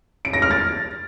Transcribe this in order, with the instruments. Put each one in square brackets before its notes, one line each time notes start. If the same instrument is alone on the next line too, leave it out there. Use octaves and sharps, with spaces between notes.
[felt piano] D7
A#6
F6
A6